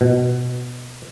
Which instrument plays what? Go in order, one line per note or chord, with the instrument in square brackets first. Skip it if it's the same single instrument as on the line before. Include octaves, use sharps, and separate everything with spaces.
[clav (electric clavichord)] B2